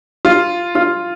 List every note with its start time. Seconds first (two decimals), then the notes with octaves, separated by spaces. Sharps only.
0.25 F4
0.75 F4